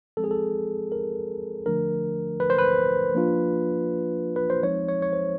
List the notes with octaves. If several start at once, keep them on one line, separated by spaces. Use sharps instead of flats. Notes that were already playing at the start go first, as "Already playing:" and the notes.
F3 G#3 C4 A4
G#4
A4
A#4
D3 F3 A3 D4 A#4
B4
C5
B4
F3 A#3 D4 F4
B4
C5
F3 G#3 C4 D#4 C#5
C#5
C#5
C5